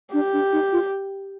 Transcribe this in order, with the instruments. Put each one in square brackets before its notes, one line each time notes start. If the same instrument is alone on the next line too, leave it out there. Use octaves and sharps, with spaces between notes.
[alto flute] D4 [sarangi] G4
[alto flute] D4
D#4
F4